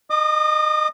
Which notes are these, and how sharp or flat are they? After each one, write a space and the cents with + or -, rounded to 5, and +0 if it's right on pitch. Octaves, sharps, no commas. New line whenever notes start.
D#5 -20 D6 +40